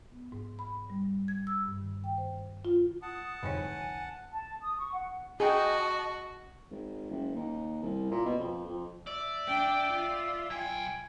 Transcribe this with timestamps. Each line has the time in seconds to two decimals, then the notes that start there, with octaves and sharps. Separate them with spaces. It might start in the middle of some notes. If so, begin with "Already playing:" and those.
0.12 B3
0.32 G#2
0.59 B5
0.90 G3
1.28 G#6
1.47 E6
1.65 G2
1.81 D#3
2.04 G5
2.18 C5
2.65 F4
3.02 F#5 A5 D#6
3.43 C2 F2 G#2 D3 D#4 C#5 G#5
4.31 A5
4.62 D#6
4.78 C#6
4.93 F#5
5.40 F#4 G#4 D#5 G5 A5
6.71 G#1
7.11 F#1
7.36 D#2
7.83 C2
8.11 A#2
8.25 B2
8.39 F2
8.66 F2
9.07 D5 E5
9.47 D4 G5
9.92 F4
10.50 B1 G5 G#5